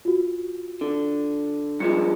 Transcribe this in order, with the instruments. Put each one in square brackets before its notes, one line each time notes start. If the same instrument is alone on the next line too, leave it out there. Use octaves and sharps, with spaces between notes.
[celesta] F4 F#4
[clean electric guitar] D3
[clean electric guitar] G2 F3 G#3 [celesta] C#7